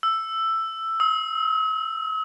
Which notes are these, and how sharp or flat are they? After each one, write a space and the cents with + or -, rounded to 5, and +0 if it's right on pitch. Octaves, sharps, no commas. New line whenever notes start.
E6 +5
E6 -45